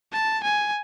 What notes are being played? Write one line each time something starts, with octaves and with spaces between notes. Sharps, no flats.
A5
G#5